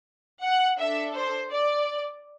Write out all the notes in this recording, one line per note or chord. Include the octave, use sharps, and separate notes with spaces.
F#5
D4 A4 E5
C5
D5